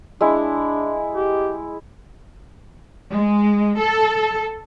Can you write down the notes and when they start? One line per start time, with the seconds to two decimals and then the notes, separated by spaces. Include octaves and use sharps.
0.21 G#3 D4 E4
1.14 G4
3.11 G#3
3.79 A4